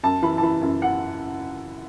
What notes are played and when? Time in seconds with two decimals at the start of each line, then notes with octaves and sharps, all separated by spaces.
0.03 F#2 A5
0.22 E3 B5
0.38 A5
0.42 E3 B5
0.62 F#2
0.82 F#5